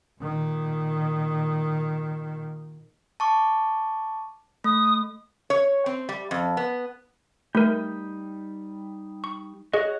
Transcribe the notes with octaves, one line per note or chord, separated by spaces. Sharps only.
A#2 D#3
A5 C#6 D6
A3 D#6
C#5
C4
G3
F2
B3
G3 A3 D#4 A#4 G5
C#6
F#4 G#4 C#5 D#5 F#5